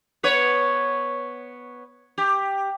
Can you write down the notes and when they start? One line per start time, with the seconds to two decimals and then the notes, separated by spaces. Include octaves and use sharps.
0.23 B3 B4 C#5
2.18 G4